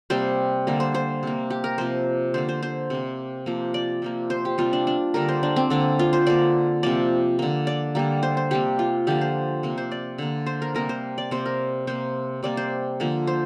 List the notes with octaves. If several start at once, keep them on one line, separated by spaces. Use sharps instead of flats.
C3 G3 A#3 C5
D3 G3 A#3
C5
C5
C3 A#3
G4
A#4
C3 F3 A#3 C5
D3 A#3 C5
C5
C5
C3 A#3
C3 F3 A#3
D5
C3 F3 A#3
C5
G4
C3 G3 A#3 F4
D4
D4
D3 G3 A#3 A#4
C5
D4
C4
D3 A#3 D4
F4
C5
D3 A#3 D5
C3 F3 A#3 D5
D3 A#3
D5
D3 G3 A#3
C5
C5
C3 G3 A#3 G4
F4
D3 F3 A#3 G4
C5
C3 A#3
C5
D5
D3 A#3
C5
A#4
C3 G3 A#3 A#4
C5
D5
C3 A#3 C5
A#4
C3 A#3 C5
C3 G3 A#3 D5
C5
D3 F3 A#3
C5